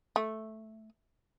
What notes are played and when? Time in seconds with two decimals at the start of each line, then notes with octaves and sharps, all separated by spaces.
0.16 A3